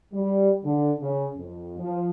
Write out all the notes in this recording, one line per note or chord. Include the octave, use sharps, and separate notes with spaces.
G3
D3
C#3
F2
F3